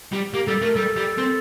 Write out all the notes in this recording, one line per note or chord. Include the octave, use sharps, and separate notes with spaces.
G3
A#3 G4
G3 A4
A3 A#4
G3 A4
G3
C4